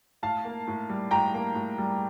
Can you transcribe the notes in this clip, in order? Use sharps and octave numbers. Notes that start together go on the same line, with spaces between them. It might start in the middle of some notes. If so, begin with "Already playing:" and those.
A2 F5 A5
A#3
A2
G3
A2 G5 A#5
A#3
A2
G3